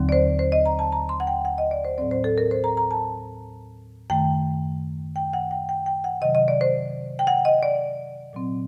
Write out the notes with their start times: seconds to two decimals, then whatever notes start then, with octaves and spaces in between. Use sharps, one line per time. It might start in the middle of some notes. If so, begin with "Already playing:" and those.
Already playing: D#2 D3 F#3 C4
0.09 D5
0.12 C5
0.39 C5
0.52 D#5
0.66 A#5
0.79 A5
0.92 A#5
1.09 C6
1.20 F#5
1.27 G5
1.45 F#5
1.58 D#5
1.71 D5
1.85 C5
1.98 A2 F#3 C4 D5
2.11 C5
2.24 A4
2.38 A#4
2.51 C5
2.64 A#5
2.77 A#5
2.91 A5
4.10 F#2 D#3 A3 G5
5.16 G5
5.33 F#5
5.51 G5
5.69 G5
5.86 G5
6.04 F#5
6.21 C3 D#3 F#3 D#5
6.35 D#5
6.48 D5
6.61 C5
7.19 G5
7.27 F#5
7.45 D#5
7.63 D5
8.33 A#2 F#3 C4